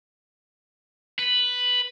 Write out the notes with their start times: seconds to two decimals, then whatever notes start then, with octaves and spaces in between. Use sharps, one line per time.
1.19 B4